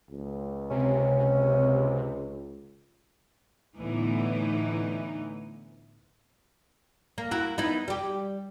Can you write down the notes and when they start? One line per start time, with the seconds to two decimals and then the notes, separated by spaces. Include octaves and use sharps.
0.10 C#2
0.71 C3 C#4
3.75 D2 A2 E3 B3 D#4
7.18 A#3
7.31 E4 F#4 A#4
7.58 B3 D#4 E4
7.88 G3 G4